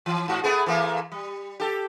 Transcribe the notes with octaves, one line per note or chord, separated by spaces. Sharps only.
E3
G#2 F#4
A3 B3 G#4
E3 A3 A#3
G3
G4 A4